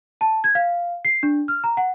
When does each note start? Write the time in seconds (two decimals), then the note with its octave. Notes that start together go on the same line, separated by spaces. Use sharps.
0.21 A5
0.44 G#6
0.55 F5
1.05 C7
1.23 D4
1.48 F6
1.64 A#5
1.77 F#5